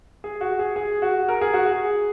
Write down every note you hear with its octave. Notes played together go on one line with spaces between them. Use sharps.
G#4
F#4
G#4
G#4
F#4
A#4
G#4
F#4
G#4